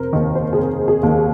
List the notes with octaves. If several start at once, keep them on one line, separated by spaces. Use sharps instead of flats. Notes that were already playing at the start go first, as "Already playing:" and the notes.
Already playing: F1 A#4 C5
D#2 D#3
C5
G#4
F1 A#4
G#4
D#2 D#3